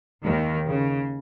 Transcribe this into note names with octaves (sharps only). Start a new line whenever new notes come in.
D#2 D#3
C#3